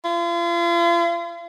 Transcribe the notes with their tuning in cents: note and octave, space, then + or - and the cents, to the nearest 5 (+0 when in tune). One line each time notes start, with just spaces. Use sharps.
F4 -40